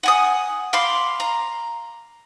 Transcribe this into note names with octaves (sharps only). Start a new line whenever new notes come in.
F#5 G#5 D#6
F5 B5 C6 D6
A#5